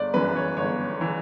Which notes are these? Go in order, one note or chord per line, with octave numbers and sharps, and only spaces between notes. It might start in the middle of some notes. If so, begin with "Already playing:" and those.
Already playing: G1 D5
F#2 E3 B4
C#5
G1 C#5
E3